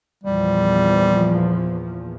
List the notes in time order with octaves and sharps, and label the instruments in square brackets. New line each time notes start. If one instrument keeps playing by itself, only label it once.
[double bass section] E2 A#2 F3 [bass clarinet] G3